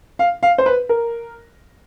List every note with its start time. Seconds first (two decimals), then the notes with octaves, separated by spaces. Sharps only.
0.19 F5
0.43 F5
0.58 C5
0.66 B4
0.89 A#4